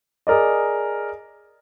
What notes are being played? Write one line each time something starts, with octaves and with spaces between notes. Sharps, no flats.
G#4 A#4 D5 D#5